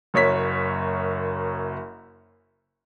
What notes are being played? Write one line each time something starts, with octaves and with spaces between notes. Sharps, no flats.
F#1 F#2 C#5 B6